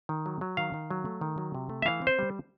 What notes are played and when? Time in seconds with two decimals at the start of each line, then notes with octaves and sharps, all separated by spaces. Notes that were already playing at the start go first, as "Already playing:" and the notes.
0.09 D#3
0.26 F#3
0.41 F#3
0.57 D#3 F5
0.74 D#3
0.90 F#3
1.05 A3
1.21 D#3
1.38 F#3
1.54 C3
1.69 A3
1.82 E5
1.86 E3 F5
2.02 C4
2.07 C5
2.19 G3